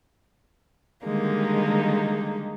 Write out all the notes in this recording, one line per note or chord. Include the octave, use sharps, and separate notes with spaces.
D3 D#3 G3 G#3 A#3 D#4